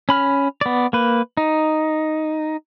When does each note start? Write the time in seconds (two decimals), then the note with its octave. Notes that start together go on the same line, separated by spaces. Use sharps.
0.09 C#4 B5 F6
0.61 B3 D5
0.93 A#3 B4
1.37 D#4